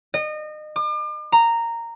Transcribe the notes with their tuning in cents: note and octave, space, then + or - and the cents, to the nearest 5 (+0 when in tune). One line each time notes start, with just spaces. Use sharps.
D#5 -30
D6 +40
A#5 -10